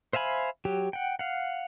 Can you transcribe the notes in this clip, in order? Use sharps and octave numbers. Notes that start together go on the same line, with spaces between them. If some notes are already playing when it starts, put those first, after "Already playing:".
C5 E5 F5 G#5 B5
F#3 G4
F#5 G5
F5 F#5